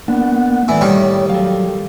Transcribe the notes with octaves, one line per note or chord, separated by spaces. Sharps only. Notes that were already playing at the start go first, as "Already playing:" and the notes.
A#3 B3 D4 F#5
A2 E3 A3 D5
D#3 G3 C#5
F#3 A4 F5